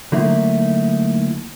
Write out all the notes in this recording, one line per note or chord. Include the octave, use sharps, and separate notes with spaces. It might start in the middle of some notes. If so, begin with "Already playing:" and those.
D3 F#3 A3 A#3 D#4 E4